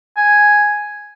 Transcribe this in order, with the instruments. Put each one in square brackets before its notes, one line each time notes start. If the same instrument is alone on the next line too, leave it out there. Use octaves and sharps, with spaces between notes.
[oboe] G#5